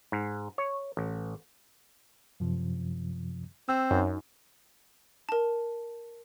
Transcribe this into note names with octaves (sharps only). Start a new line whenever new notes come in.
G#2
C#5
A1
F#2 C3 F3
C4 E6
F#2 D#4
A#4 A5